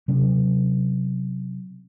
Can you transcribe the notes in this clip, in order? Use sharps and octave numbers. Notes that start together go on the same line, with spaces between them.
C3 F#3 C#4